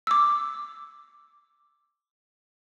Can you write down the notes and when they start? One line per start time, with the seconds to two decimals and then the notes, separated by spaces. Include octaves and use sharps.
0.07 D6 E6